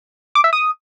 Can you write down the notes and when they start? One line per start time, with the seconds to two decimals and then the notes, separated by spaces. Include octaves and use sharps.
0.35 D6
0.44 E5
0.53 D#6